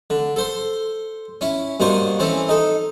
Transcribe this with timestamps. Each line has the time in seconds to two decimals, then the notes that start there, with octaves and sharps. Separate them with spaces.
0.10 D3
0.36 A4 C5 C6
1.41 C#4 E4
1.80 G2 B2 A#3 C5 C#6
2.19 E3 C4 C#4 A4
2.49 D#4 A4